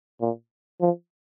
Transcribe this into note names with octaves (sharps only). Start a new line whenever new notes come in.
A#2
F3